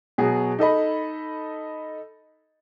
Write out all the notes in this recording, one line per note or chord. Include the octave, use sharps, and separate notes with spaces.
B2 F#3 F#4 G#4
D#4 A4 D#5 B5